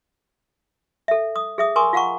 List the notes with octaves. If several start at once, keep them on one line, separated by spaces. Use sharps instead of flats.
A4 E5
D#6
G#4 E5 D#6
A#4 G#5 C6 C#6 D#6
F4 F5 F#5 A#5 C#6